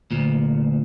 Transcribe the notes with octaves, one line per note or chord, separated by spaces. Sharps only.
D2 A#2